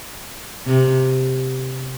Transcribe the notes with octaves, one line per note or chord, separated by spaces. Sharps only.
C3